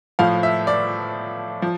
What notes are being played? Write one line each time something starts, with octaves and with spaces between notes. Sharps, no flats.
A2 F3 F5
E5
D5
F3